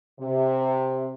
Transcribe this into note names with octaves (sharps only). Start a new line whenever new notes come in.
C3